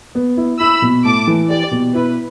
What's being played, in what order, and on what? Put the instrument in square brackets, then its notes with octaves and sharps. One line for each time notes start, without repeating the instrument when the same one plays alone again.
[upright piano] B3
E4
[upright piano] E4 [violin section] B5 E6
[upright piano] B2
[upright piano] A2 [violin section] A5 D6
[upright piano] E3
[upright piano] G4 [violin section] D5
[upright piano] B2
[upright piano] E4 [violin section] B4